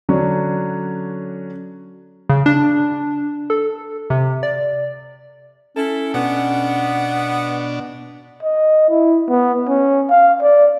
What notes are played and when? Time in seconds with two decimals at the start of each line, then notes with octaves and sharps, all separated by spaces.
0.09 D3 F#3 C#4 D4
2.29 C#3
2.46 D4
3.50 A4
4.10 C3
4.43 D5
5.77 C#4 E4 A4
6.14 B2 B3 D4 F#5
8.43 D#5
8.90 E4
9.29 B3
9.68 C#4
10.10 F5
10.41 D5